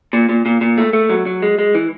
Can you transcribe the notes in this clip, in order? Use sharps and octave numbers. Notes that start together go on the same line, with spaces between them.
A#2
A#2
A#2
A#2
A3
A3
F#3
F#3
G#3
G#3
E3